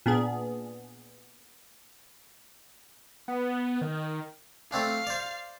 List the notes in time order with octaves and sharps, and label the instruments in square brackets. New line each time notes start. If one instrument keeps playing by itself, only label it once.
[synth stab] A#2 B3 D4 G#4
[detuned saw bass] B3
D#3
[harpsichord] A3 C4 D4 [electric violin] F5
[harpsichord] C5 D5